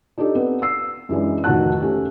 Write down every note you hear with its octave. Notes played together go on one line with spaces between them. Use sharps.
D4 D#4 G4 A4 D5
B3 C4
E6 C7
F#2 E3 G#3 D4
F1 D#3 F#4 F#5 A5 F#6
A3 C#4 G4